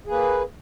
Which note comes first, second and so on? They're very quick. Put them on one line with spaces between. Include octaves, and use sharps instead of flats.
G#4 A#3 B4